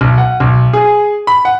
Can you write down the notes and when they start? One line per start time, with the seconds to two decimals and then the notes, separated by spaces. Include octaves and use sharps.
0.01 B1
0.18 F#5
0.40 B1
0.73 G#4
1.27 B5
1.45 F#5